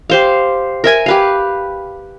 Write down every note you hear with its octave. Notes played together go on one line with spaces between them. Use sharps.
G4 C5 F5
A#4 E5 G#5
G4 B4 F5